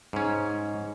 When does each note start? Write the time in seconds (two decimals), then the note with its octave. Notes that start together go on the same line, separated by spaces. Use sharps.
0.13 G#2 C#4